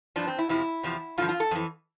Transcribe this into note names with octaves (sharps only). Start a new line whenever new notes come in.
G2 F3 D4
C4
E4
F2 C3 F3 E4
E2 C3 F3
G2 D3 F3 F4
F4
A4
F2 E3